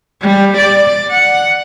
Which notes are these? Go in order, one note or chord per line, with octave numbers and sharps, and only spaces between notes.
G3
D5
F#5